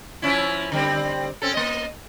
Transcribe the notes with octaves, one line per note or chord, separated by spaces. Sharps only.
F3 C#4 E4
D3 G3 C4
C4 C#4 A4
A#3 D#5